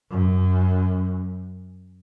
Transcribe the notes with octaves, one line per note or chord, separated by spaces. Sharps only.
F#2